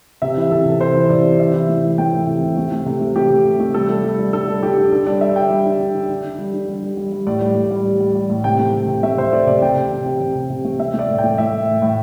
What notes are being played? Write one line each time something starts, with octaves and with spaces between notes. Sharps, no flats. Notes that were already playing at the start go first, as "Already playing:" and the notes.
C3 E5
E3
C3 A4
C3
C3 C5
E3
C3 D5
E3
C3 E5
E3
A3
E3
A3 G5
E3
C3
C3
A3
A3
C3
A3
A3 G4
C3
C3
A3
G3 A4
G3
G3
G3
D3 A4
G3
D3 G4
D3
D3 A4
G3 D5
G3 E5
D3 G5
G3
D3
D3
D3
D3
D3
G3
D3
G3
G3
G3
G3
A2 D5
G3
A2
G3
G3
G3
G3
A2
C3 G5
A3
C3
C3
A3 E5
C3 C5
A3 D5
C3 D5
C3 G5
C3
C3
C3
C3
C3
C3
A3
A3 E5
A3 D5
A2
G5
A3
A2 E5
A2
A2
A2